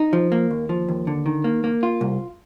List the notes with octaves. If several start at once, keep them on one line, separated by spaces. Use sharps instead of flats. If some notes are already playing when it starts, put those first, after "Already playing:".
Already playing: D#4
F3
A#3
D#2
F3
D#2
D3
D#3
A#3
A#3
F4
C2